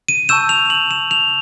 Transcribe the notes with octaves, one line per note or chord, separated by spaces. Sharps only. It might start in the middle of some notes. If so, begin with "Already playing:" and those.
D#7
A5 C#6 E6 G6 E7
F7
F#7
E7
F7